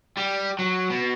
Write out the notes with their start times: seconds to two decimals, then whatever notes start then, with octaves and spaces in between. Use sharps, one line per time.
0.17 G3
0.59 F#3
0.90 B2